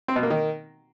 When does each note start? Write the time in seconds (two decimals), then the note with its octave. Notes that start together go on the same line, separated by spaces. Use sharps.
0.08 C4
0.16 B2
0.23 A#3
0.30 D#3